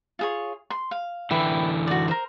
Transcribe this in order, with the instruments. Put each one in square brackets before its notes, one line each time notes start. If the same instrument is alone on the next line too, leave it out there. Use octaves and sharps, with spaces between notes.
[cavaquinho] F4 G#4 C#5
C6
F5
[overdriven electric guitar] D3 E3 [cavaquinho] B4 E5 G5
[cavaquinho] F#4 D5
A#4 C5